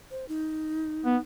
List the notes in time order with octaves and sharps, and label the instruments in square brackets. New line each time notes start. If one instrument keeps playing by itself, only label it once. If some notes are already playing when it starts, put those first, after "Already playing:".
[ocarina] C5
D#4
[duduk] B3